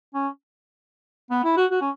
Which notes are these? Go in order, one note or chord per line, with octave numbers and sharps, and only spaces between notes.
C#4
B3
E4
F#4
F#4
C#4